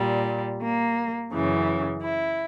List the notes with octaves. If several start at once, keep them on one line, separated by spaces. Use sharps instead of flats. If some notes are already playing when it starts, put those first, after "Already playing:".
Already playing: A#2 G3
A#3
F#2 C#3 E3
E4